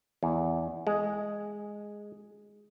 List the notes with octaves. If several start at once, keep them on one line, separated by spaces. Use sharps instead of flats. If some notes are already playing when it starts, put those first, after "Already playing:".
E2
G#3